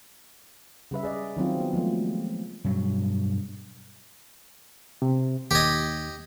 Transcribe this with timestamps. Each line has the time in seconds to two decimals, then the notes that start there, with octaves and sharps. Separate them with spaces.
0.91 C#3 G3 B4 E5
1.03 G#4 D5 D#5
1.37 D#3 F#3 C4 F4
1.60 B3
1.73 F3 F#3 G#3 A3
2.64 G2 B2 F#3
5.02 C3
5.51 D#2 G4 D#5 G#6